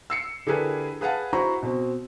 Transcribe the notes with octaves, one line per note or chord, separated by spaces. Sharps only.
E6 C7 C#7
D3 E4 G4 G#4 A#4 B4
G#4 B4 F5 F#5 A5
E4 F#4 C5 A#5 B5 C#6
B2 C4